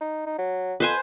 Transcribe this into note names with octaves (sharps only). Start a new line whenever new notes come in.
D#4
D#4
F#3
F2 B4 C5 G#5